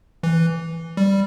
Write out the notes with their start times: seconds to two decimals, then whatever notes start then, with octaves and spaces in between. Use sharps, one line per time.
0.23 E3
0.97 G3